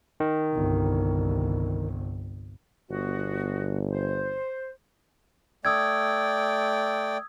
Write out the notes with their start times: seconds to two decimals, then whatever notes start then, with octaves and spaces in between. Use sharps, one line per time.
0.20 D#3
0.53 G1 C2
2.90 G1 B3 F4 F#4
3.91 C5
5.65 A3 D5 G5 D#6 E6 G#6